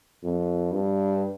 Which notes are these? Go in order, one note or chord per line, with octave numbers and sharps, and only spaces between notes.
F2
G2